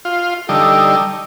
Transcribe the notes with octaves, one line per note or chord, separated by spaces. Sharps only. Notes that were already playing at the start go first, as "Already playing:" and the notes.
F4
D3 G3 D#4 A4